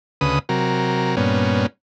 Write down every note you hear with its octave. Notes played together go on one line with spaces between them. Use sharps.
D2 C#3 B4 D#6
C3 F#3 A#4
G2 A#2 B3 C#4